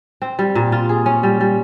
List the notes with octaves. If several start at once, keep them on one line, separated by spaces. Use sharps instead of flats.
C4
G3
A#2
F4
G#4
C#4
G3
G3